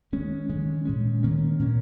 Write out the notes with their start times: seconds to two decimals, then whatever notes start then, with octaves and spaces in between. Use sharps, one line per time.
0.12 D#3 G#3 C#4
0.49 D#3 G#3 C#4
0.85 A#2 G#3 C#4
1.23 D#3 A#3 C#4
1.59 A#2 A#3 C#4